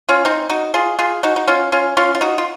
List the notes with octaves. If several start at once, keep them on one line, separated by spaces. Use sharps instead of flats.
C#4 F4
C4 D#4
D#4 F#4
F4 G#4
F4 G#4
D#4 F#4
D#4
C#4 F4
C#4 F4
C#4 F4
F4
D#4 F#4
F4